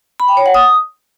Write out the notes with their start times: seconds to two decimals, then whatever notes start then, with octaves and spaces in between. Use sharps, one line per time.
0.20 B5
0.28 G5
0.37 C#5
0.46 F#5
0.54 D#6